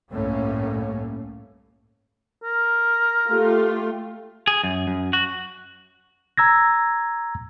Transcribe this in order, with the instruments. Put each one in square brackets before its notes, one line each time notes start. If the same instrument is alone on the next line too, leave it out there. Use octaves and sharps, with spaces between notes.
[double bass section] G1 C2 A2 A3 A#3 C#4
[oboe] A#4
[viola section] A3 F4 G4
[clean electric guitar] G#4
F#2
F#2
F#4
[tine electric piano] A#5 E6 G#6 A#6